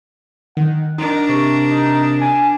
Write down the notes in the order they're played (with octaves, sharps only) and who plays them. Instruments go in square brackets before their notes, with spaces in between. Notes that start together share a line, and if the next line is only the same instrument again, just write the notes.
[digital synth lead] D#3 [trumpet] F#5
[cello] D4 A#4 [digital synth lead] D#4
[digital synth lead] C3 [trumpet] C#6
[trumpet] D#4
[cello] D4 [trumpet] G#5